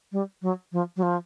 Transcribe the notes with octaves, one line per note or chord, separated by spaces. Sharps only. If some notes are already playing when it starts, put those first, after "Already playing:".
G3
F#3
F3
F#3
F3